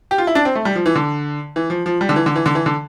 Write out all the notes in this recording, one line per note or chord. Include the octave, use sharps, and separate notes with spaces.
G4
F4
E4
D4
C4
A3
G3
F3
E3
D3
E3
F3
F3
G3
D3
E3
D3
E3
D3
E3
D3